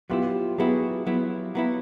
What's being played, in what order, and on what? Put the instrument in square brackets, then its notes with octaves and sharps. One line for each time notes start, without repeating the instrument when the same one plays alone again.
[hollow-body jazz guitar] F#3 B3 E4 [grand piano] F4 G4
[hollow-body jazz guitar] F#3 B3 E4 [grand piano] F#4 G#4
[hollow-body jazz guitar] F#3 B3 E4
F#3 B3 E4